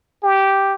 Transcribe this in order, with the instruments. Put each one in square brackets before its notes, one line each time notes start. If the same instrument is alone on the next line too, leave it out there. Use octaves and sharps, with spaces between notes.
[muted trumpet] G4